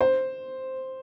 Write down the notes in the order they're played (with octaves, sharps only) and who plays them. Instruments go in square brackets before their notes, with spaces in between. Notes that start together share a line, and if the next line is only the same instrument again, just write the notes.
[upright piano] C5